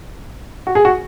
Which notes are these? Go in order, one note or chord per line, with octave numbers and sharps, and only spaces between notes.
F#4
G#4
F#4